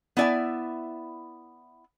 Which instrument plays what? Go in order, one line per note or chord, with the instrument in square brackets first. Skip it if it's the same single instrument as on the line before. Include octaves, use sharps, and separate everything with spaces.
[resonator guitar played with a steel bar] B3 E4 D5 E5 G#5